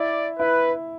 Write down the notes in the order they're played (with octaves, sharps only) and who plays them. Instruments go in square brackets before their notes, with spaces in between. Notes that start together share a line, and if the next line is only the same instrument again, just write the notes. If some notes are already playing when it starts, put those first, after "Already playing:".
Already playing: [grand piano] E4 [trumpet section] D5
[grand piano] E4 [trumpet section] B4